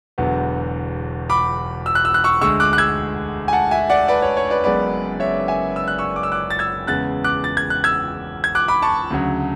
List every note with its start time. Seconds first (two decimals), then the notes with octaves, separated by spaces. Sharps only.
0.18 E1 E2 D3 F#3 B3
1.29 B5 D6
1.86 E6
1.95 F#6
2.05 E6
2.14 F#6
2.24 C#6 E6
2.41 D2 D3 G#3 C#6 E6
2.60 D6 F#6
2.73 F#6
2.78 E6 G#6
3.48 G#5
3.53 F#5 A5
3.71 E5 G#5
3.90 D5 F#5
4.08 B4 D5
4.22 C#5
4.37 C#5
4.50 B4 D5
4.64 F#1 F#2 C#3 G#3 B3 B4 D5
5.20 C#5 E5
5.48 E5 G#5
5.76 E6
5.88 F#6
5.98 C#6 E6
6.16 D6
6.23 E6
6.32 D6 F#6
6.50 A6
6.59 E6 G#6
6.87 E2 C#3 G#3 B3 F#6 A6
7.24 D6 F#6
7.44 A6
7.57 G#6
7.70 F#6
7.84 E6 G#6
8.44 G#6
8.55 D6 F#6
8.68 B5 D6
8.82 A5 C#6
9.10 D2 C#3 F#3